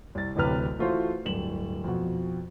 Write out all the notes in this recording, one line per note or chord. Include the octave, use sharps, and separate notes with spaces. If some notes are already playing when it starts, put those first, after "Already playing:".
C2 A6
D1 A1 D2 C3 B4 F6
E3 A3 F4 F#4 C5
D1 G2 E7 F#7
F2 B2